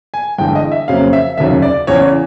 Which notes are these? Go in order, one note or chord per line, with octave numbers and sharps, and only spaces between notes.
G#5
G1 G2 E3 G#3 G5
D#5
E5
F2 C#3 F#3 A#3 F5
E5
F1 D#2 C#3 F#3 E5
D5
E2 C#3 E3 C#5